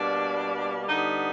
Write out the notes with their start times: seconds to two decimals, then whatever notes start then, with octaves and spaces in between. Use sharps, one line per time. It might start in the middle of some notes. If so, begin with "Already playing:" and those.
Already playing: B2 G3 A#3 D4
0.89 D3 G3 B3 D#4